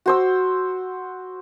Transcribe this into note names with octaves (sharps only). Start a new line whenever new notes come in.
F#4 C5 E6